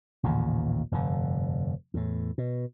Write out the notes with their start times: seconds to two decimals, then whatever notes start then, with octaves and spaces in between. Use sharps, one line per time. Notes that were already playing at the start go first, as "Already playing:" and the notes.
0.23 A1 D#2 A#2 C#3
0.92 F1 G2 D3
1.94 E2 A2
2.38 B2